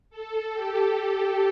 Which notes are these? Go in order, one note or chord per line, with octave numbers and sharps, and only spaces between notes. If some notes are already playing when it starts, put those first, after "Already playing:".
A4
G4
A4